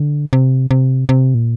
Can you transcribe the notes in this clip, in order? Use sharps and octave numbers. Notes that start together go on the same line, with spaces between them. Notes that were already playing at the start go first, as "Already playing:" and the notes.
Already playing: D3
C3
C3
C3
A#2